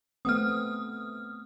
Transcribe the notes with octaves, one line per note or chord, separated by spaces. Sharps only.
A3 B3 C4 D#6 F6